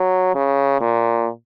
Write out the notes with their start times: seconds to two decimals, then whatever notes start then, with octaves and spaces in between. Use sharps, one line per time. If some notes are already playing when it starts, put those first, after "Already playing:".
Already playing: F#3
0.35 C#3
0.81 A#2